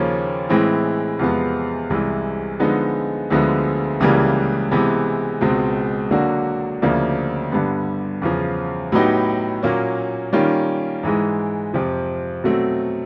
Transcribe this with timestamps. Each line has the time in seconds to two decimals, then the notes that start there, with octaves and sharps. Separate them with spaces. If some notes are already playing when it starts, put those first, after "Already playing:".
Already playing: D#2 C#3 F3 A#3 C#4
0.49 A2 E3 G#3 C4 E4
1.19 E2 C3 F3 G#3 B3
1.90 C2 C3 E3 G#3
2.60 D3 F3 G#3 B3 D#4
3.30 D2 D3 F3 G#3 B3
4.00 C#2 C#3 E3 G3 A#3
4.71 C3 E3 G#3 B3
5.41 C#2 B2 G#3 C4
6.11 D3 F#3 A#3 D4 F#4
6.82 D2 C#3 F3 A#3 D4
7.52 G2 D3 G3 B3
8.22 E2 C#3 F3
8.92 A2 F#3 B3 D#4 G4
9.63 A#2 F#3 A#3 C#4
10.33 D#3 G3 A#3 C#4 F4
11.03 G#2 E3 G#3
11.74 F2 C3 F3
12.44 B2 F#3 A3 C4